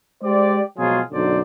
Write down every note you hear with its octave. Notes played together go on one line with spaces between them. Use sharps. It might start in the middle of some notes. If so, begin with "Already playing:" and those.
G#3 G4 C5 D5
B2 F3 F#3 G#3 F4 G#4
B1 F#2 D3 F#3 C5 D5